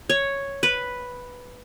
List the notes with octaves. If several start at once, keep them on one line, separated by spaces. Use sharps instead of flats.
C#5
B4